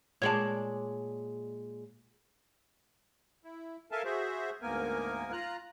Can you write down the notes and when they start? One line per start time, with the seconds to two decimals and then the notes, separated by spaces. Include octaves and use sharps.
0.22 A#2 G#3 C#5 D5 A5
3.44 E4
3.92 A4 A#4 E5 F5 G#5 A5
4.05 F#4 G#4 C5 E5
4.62 D2 G#2 A#3 B3 A#4 G#5
5.32 F4 A#5 F#6